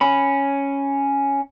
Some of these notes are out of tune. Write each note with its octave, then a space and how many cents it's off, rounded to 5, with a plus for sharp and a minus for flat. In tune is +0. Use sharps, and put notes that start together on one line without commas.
C#4 +0 B5 +0